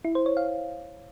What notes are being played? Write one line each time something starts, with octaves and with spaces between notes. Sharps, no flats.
E4
C5
C#5
F5